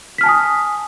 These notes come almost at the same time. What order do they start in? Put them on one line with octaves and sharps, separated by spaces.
B6 F6 A5 G#5 D#6